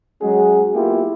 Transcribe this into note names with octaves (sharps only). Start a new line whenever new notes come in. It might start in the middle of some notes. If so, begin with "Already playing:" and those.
F#3 G#3 C#4 F#4 G#4
F#3 A#3 B3 E4 F4 G4